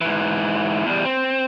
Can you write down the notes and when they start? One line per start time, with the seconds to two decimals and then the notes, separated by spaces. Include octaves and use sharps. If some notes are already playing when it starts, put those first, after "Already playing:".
0.01 G#2 E3
0.86 E2 G3
1.05 C4